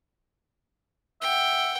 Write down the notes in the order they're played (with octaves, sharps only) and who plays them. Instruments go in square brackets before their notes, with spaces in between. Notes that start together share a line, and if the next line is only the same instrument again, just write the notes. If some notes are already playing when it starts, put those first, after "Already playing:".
[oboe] E5 [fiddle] F#5 G5